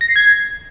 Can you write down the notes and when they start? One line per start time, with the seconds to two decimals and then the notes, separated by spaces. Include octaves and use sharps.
0.01 A#6
0.08 C7
0.16 G#6